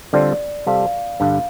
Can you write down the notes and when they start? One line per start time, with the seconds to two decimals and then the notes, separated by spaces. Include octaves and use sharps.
0.13 D3 G3 C4 F4 A4 D5
0.66 C3 G3 F4 A4 F5
1.20 G2 D3 G3 F5